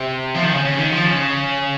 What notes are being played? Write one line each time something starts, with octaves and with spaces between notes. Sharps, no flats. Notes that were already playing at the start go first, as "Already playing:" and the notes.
Already playing: C3
F3
D#3
C#3
C#3
D#3
F3
C#3